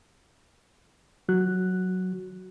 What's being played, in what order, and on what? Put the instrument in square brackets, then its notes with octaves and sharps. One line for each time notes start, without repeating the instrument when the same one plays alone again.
[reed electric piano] F#3 F#4 F#6